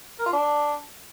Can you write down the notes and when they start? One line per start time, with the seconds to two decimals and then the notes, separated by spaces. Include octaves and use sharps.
0.19 A#4
0.26 F4
0.33 D4